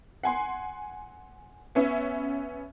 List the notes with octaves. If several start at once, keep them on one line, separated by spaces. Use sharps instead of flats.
F#5 G#5 C6
B3 C#4 E5